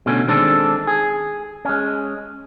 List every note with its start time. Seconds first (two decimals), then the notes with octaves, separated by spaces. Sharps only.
0.06 B2 D3 A3 C#4
0.28 D#3 G#3 C4 D4 A4
0.87 G#4
1.65 G#3 C#4